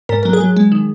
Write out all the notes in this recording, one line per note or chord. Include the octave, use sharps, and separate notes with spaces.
G#2 A#4
F#3 A#4
G#4
F#3
G#3
D#3